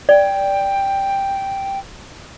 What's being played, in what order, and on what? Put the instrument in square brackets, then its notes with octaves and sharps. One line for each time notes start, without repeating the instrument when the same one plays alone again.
[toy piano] D5 [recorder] G5